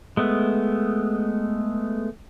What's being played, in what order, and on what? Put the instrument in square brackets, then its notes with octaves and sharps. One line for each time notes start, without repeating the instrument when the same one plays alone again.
[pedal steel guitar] G#3 A3 B3